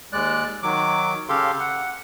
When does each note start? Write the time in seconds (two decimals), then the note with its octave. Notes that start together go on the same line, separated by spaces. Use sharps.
0.13 D#2 G#3 D5 F#6
0.63 D#3 F#3 D6
1.29 C#3 G4 A4 F5 C6
1.60 F#5